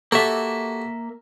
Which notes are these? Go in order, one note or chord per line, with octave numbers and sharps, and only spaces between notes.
A#3 F#4 G4 A4 E5